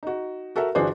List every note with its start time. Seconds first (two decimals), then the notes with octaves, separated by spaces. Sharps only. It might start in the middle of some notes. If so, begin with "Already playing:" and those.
0.03 D#4 F#4
0.56 F#4 A4 A#4 E5
0.75 G1 E3 D4 F#4 G#4 C5